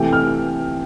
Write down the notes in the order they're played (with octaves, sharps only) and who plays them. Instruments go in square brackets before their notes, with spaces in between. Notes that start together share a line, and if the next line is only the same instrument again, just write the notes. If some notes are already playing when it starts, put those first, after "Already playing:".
Already playing: [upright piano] C3 E3 A3 G5
F6